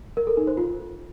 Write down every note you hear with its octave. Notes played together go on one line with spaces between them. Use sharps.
A#4
A4
D#4
C5
F4